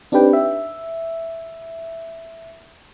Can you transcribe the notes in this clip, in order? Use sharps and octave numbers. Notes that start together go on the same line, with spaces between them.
C4 D4 D#4 G4 B4 G5
E5